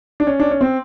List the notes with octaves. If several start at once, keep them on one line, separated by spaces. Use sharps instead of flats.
D4
C#4
D4
C#4
C4